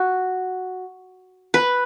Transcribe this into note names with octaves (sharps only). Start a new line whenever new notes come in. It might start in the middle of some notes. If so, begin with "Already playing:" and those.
Already playing: F#4
B4